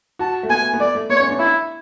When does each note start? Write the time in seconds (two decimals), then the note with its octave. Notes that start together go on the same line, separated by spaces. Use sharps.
0.19 F#4 A5
0.43 A3
0.49 B3 G#5
0.74 B3
0.79 A3 D5
0.95 A3
1.09 B3 C#5
1.20 C#4
1.29 D4
1.39 E4